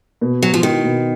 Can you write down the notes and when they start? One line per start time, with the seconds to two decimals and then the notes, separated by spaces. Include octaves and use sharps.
0.21 B2
0.42 F#3 F#4
0.54 F3
0.63 D#3 F#4
0.84 B2